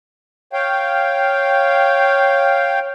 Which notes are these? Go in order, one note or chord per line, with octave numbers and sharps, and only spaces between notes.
C#5 F5 G5